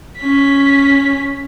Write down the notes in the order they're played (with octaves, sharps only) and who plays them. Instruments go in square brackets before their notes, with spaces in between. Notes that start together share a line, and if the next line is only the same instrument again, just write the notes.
[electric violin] C#4 B6